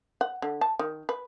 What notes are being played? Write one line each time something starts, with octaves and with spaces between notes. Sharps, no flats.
F#5
D3
A5
D#3
B4